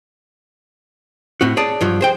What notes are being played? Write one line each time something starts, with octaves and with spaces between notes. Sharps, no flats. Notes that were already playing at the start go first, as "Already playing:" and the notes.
A2 C4 F#4
G#4 C#5 D5 A5
G2 F3 F#3
G#4 C5 G5